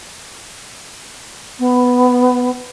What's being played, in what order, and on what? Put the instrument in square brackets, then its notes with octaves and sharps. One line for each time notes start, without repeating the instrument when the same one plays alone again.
[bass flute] B3